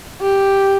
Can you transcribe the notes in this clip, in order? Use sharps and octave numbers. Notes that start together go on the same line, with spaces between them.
G4